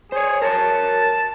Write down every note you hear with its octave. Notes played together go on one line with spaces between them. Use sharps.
G#4 C5 C#5
A#4 C#5 A5